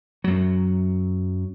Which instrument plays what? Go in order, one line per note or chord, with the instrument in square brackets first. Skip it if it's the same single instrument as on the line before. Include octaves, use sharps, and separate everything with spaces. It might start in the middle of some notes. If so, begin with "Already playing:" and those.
[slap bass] F#2 F#3